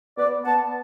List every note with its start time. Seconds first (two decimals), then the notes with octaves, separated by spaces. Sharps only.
0.17 B3 B4 D5
0.45 B3 F#5 A5